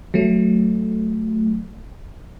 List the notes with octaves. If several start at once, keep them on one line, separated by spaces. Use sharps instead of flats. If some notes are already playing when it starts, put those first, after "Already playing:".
F#3 A3